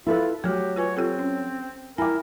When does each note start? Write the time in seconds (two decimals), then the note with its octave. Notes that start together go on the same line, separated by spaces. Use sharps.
0.07 E4 F4 A4 B4
0.44 F#3 A3 F#4 G4
0.76 F4 B4 C#5 G#5
0.97 C4 F4 G4 A4
1.19 C#4
1.98 E4 A#4 G5 G#5 D6